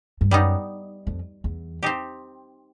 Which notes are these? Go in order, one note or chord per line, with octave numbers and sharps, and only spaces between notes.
G2
F#2 G3 B3 D#4
F2
E2
C4 D#4 G4